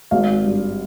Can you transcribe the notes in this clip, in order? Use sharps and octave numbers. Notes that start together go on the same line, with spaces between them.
G#1 F5
G2